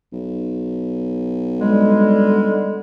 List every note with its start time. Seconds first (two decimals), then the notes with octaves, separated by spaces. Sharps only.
0.12 B1
1.60 D3 G3 G#3